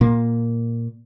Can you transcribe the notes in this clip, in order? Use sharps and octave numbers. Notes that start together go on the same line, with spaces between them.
A#2 A#3